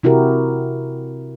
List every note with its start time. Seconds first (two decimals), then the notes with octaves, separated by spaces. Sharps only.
0.03 C3 E4 F#4 G4 A#4